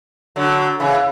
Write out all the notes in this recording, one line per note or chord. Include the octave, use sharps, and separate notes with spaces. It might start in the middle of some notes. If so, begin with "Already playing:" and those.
D3 F#3
C#3 E3